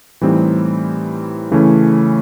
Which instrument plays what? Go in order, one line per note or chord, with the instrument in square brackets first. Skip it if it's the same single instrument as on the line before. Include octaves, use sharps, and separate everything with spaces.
[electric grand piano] A2 E3 G3 C4 D#4
C#3 E3 A3 C#4